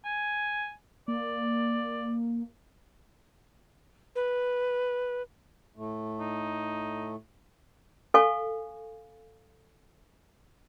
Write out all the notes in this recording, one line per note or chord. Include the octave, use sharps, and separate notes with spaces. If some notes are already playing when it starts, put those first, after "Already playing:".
G#5
A#3 D5
B4
A2 A3
D#4
A4 F5 G#5 C#6